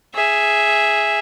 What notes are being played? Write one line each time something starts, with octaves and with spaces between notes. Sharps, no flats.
G#4 E5